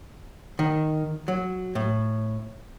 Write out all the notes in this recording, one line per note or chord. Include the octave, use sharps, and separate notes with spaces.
D#3
F#3
A2